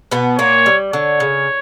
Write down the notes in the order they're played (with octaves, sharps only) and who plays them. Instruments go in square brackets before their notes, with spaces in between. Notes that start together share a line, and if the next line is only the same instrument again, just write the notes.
[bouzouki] B2 B3
[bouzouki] A#2 A#3 [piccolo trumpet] C#5
[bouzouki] G3
[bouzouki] D3 [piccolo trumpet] C#5
[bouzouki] C#3